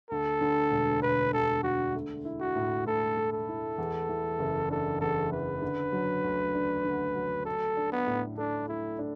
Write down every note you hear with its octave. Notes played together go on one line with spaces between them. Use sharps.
D2 A4
D3
E1
E1 B4
D2 A4
D3 F#4
A3
E4
F#4
A2
A2 A4
A3
A4
E4
E2
E3
F#1
D4 A4
E2 A4
E3 B4
D3
F#3
D2
D4
D3
F#3
A3 A4
D4
B3
A2
D4 A4
A3 E4
D4